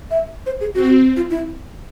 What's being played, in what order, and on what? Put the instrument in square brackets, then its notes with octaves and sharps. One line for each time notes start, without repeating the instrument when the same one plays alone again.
[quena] E5
C5
G#4
[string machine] C4 [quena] F#4
[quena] F4
E4